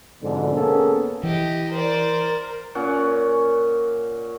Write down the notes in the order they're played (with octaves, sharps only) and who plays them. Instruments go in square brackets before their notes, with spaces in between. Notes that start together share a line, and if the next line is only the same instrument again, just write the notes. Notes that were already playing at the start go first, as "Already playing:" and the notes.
[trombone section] F2 G#2 B2 D3
A#3 B3 C#4 G#4 A4
[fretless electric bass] E3 [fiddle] G4 D#5
[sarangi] A#4 [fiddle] C5 D5
[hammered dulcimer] A#2 C#4 F#5